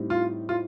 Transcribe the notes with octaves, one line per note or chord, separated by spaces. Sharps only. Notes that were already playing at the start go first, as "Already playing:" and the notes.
Already playing: A2 G3 C4 D#4
F4
F4